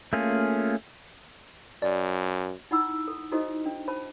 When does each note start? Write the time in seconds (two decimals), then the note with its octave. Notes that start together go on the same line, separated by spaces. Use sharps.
0.13 A3 A#3 C#4 F4 G#4
1.82 F#2 D5
2.71 D#4 E4 F#5 B5 E6
3.08 A4
3.32 D#4 E4 F#4 A4 C5 D#5
3.66 D4
3.88 C5 A5 B5